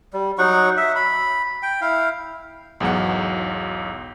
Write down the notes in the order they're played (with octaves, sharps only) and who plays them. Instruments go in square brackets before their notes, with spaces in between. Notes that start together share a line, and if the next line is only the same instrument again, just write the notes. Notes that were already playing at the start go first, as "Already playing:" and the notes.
[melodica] G3
F#3 D#4 F#5 C#6
E5
B5
G5
E4 F5
[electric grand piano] B1 E2 G#2 F#3 F#5